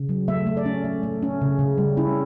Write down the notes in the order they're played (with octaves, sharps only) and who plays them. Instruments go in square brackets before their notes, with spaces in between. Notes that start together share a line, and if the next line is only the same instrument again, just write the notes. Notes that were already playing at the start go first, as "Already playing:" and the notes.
Already playing: [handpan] C#3
F#3
A3 E5
A3
D5
C#4
A3
A3
C#4
C#3
C#3
G3
C#4 E4